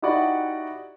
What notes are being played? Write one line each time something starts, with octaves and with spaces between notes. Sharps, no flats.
D#4 E4 F#4 G4 D5 F#5